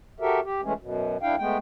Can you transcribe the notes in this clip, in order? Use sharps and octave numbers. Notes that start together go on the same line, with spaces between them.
F#4 G4 A4 A#4 E5
G4
E3 G#3 A3 C#4
F#2 B2
F#2 D4 E4 F5 G5
G#3 A3 B3 G5